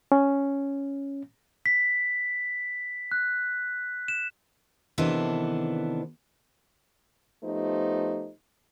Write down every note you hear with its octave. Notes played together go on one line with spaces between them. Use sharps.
C#4
B6
F#6
E7
C3 D#3 E3 B3 D4 A4
F3 A3 B3 D#4 G4 C5